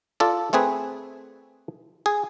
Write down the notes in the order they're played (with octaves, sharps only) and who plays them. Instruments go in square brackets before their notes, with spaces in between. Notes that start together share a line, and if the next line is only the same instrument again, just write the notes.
[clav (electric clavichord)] F4 A4 D5
A3 C4 G#4 B4
G#4